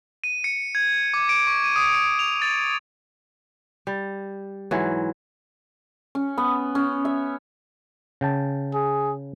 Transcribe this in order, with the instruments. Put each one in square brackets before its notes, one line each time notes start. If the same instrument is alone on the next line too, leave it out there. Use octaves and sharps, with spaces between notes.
[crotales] D#7
C#7
G#6
D6
D7
C#6
D#7
D#6
D7
F7
A6
[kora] G3
G#2 E3 F#3
[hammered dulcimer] C#4
B3
C#4
E5
[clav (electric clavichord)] C#3 G5 A5
[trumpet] G#4